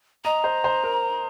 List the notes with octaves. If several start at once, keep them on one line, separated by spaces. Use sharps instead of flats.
D#5 A#5
C5
C5
A#4